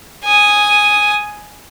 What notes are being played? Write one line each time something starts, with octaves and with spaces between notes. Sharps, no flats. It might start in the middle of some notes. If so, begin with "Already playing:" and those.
G#5 D#6